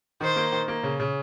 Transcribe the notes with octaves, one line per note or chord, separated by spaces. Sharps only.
D#3 C5
A#3
D#3
A#3
C#3
C#3